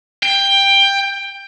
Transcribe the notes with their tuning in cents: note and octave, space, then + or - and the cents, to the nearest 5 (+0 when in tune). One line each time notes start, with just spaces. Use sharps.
G5 +15